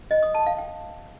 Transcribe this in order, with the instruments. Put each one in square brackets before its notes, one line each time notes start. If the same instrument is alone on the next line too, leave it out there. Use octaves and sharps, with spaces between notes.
[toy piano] D#5
D#6
A5
F5
G5